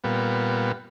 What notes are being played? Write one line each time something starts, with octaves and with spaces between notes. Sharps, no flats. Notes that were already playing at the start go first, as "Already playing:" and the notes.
A#2 G3 B3